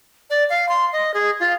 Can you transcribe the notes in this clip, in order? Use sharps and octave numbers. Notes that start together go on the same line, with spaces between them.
D5
F5
C6
D#5
G#4
F4